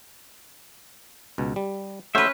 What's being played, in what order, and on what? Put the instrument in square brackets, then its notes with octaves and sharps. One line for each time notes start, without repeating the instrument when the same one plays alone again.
[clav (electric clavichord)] C#2 B2
G3
[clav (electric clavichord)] A3 F#4 F#5 [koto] C#4 B4 [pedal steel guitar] C5 E5